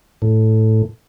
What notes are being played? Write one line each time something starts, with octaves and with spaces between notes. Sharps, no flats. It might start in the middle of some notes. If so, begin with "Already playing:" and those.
A2